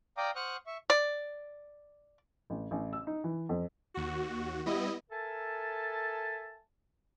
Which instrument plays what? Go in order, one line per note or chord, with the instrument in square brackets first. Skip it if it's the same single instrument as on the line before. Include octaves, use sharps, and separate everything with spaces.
[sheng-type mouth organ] D5 F5 G5 A#5 D6 D#6
C5 F#5 C#6 D#6 F6 F#6
E5 C#6
[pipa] D5
[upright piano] A1
A1
E6
D#4
E3
F2
[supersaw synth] D#2 F#4
G3 B3 E4 D#5
[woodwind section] A4 A#4 E5 G#5 A5